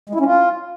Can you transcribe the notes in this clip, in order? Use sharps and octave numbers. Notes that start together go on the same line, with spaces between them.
G#3
E4
C#4
F4